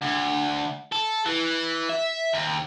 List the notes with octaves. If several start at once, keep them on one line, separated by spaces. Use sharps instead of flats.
D2
A4
E3
E5
D#2